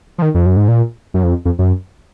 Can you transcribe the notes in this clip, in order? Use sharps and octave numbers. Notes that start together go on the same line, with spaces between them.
F3
D#3
F2
F#2
G#2
A#2
F#2
F2
F2
F#2